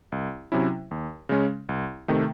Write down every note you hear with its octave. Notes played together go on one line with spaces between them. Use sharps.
C2
C3 F#3 C#4 E4
D#2
C#3 G#3 C#4
C2
C3 D#3 A3